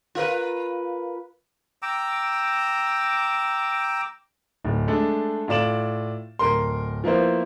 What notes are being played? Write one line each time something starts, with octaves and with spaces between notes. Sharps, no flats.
F4 A#4 B4
G5 A#5 D6 E6
D1
G#3 A3 D4 A4
A2 F4 D5 E7 F#7
D1 A#4 C6
F3 A#3 B3 E4 C5